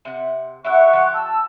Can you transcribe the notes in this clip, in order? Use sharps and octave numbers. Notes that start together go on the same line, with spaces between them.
C3 F#5
E4 G4 E5 F#5 C#6 F#6
F3 G4
A5 E6